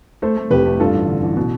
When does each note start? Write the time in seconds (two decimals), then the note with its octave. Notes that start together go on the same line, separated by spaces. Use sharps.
0.22 A3 A4 C5
0.37 A3
0.50 F1 G4 B4
0.66 A3
0.80 G2 F4 A4
0.94 A1
1.08 D3
1.22 A1
1.37 B2